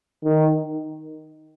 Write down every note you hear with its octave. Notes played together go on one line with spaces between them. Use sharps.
D#3